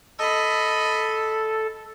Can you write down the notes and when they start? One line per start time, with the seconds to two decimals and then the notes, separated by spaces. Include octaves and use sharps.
0.19 A4 D#5 B5